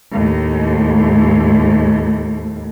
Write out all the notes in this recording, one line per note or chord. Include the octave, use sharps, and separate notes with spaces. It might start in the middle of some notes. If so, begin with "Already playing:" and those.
D#2 A2